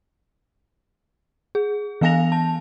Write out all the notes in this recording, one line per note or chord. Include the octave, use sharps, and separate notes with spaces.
G#4
E3 B3 F5 G#5 A#6 F7
A5